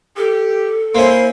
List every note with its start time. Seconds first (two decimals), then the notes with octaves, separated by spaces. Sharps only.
0.17 G4 A4
0.95 A#3 C#4 E4 C5 C6